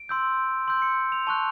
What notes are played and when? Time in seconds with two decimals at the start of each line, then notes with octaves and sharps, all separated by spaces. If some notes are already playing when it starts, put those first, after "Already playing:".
Already playing: D7
0.09 C6 E6 G6
0.68 C6 E6 G6
0.82 C#7
1.12 F7
1.27 A5 C#6 F#6 F7